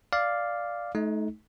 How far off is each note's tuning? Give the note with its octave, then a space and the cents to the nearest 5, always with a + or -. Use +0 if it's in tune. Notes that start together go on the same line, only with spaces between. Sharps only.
D5 +0 F5 +0
A3 -35 D#4 +15